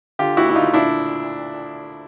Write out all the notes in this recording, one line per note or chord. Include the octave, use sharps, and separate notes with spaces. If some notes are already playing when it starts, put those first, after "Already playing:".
D3 F4 G4
D2 E4 F#4
E4
D2 D#4 F4
A#2 D4 E4